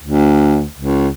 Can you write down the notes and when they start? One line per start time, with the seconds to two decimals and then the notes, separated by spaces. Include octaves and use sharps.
0.03 D2
0.78 C#2